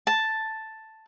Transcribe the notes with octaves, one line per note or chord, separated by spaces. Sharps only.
A5